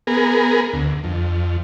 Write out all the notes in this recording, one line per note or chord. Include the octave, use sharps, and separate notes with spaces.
B3 G#4 A#4
D2
F2